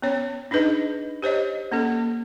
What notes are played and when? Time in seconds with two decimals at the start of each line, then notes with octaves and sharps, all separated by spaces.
0.02 B3 C#4 C#5
0.51 D4 D#4 G#4 B4 D#5
1.22 G4 C5 C#5 D#5
1.72 A#3 C#4 A4